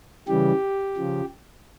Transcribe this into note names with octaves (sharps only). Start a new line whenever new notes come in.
C#3 E3 G3 G4
C#3 F3